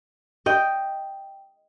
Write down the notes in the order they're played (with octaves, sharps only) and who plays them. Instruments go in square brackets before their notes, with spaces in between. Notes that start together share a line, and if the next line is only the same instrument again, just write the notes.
[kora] D#5 G5